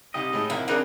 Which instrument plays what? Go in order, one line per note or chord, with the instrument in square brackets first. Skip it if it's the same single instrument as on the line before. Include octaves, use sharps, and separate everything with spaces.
[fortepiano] C2 D#4 G4 [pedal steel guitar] D#5
[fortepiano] A2 G#3 D#4
[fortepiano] C2 A#4 [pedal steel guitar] F3 E4 F#5 [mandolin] F5
[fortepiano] C#3 C4 [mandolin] D4 D#4 A#4